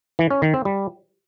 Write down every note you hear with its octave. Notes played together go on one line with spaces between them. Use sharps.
E3
C#4
D#3
C4
G3